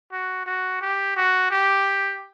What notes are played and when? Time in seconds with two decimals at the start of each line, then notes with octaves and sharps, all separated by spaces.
0.12 F#4
0.46 F#4
0.81 G4
1.17 F#4
1.51 G4